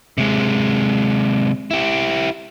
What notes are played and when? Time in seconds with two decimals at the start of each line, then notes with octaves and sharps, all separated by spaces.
0.18 C3 G#3
1.71 E4 G4